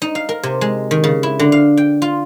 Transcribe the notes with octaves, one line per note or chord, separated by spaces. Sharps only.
D#4
F5
A#4
C3
G#3
D#3
C#3
E4
D3
F5
G5
F4